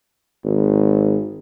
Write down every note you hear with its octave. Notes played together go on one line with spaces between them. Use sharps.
G#1